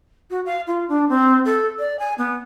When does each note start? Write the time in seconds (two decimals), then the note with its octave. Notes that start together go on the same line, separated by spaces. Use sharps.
0.30 F#4
0.46 F5
0.67 F4
0.89 D4
1.09 C4
1.45 A4
1.79 D5
1.99 G#5
2.18 B3